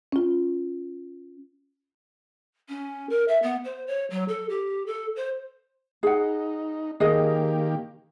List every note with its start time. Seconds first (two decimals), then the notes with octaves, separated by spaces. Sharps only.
0.12 C#4 F4
2.69 C#4
3.10 A#4
3.28 E5
3.43 B3
3.65 C5
3.87 C#5
4.10 F#3
4.28 A4
4.49 G4
4.87 A4
5.16 C5
6.03 D#4 G#4 F#5
7.00 D#3 A#3 G4 G#4 A#4 D#5